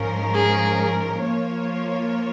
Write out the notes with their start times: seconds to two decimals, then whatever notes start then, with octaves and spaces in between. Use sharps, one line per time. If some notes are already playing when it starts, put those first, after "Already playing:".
Already playing: G#2 F3 C#4 A#4
0.34 G#4
1.21 F3 A#3 F4 C#5